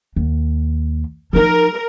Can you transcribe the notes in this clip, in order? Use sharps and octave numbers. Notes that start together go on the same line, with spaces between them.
D#2
F3 D#4 A#4